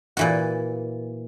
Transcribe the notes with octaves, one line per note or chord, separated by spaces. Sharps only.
A#2 E3 F#4